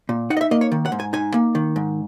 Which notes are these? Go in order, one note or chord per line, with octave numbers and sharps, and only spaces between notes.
A#2
D#4 F#5
D#5
E5
A#3 D#5
C#5
D#3
F#5
G#2
G#5
D#4 G#5
A#3
D#3
G#2